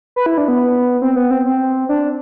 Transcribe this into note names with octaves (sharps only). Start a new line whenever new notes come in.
B4
E4
D4
B3
C4
B3
C4
C4
D4